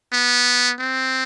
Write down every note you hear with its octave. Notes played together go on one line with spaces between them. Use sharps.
B3
C4